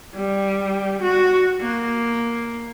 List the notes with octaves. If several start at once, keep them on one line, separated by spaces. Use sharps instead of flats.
G3
F#4
A#3